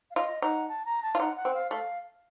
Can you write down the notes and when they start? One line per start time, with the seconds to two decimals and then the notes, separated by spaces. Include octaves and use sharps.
0.11 F5
0.16 F4 D#5
0.42 D#4 F#5
0.69 A5
0.85 A#5
1.03 A5
1.15 F4
1.20 D#4 F#5
1.37 F#5
1.45 C4
1.54 F5
1.71 A3 F5